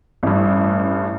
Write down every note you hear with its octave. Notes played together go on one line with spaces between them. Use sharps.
A1 G2